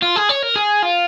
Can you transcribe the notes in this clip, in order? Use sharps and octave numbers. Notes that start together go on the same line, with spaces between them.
F4
G#4
C#5
A#4
G#4
F4